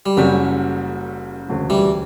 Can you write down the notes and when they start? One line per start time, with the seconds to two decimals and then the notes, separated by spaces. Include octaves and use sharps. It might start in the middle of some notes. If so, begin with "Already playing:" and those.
0.06 G3
0.17 F#1 F#2 C#3 F#3 G3 C#4
1.48 E1 D2 C#3 F#3
1.70 E3 G3